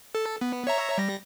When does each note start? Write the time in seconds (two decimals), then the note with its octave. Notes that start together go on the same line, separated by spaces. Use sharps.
0.15 A4
0.41 B3
0.67 C#5 E5 A#5
0.98 G3 A#6